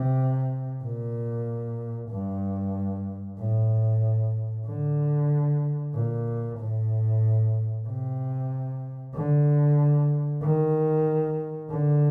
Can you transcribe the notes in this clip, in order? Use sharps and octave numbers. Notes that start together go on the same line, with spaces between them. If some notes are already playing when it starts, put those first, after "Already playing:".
Already playing: C3
A#2
G2
A2
D3
A#2
A2
C3
D3
D#3
D3